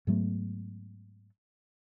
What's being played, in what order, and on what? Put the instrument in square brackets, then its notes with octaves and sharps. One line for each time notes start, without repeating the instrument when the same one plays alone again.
[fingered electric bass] G#2 F#3 A3 B3